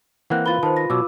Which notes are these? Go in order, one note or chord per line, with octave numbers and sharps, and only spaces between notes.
E3 A#3 C4 F#5 F#6
F4 B4 A6 G7
D#3 C5 A5
A#6
B2 F#3 D6 E6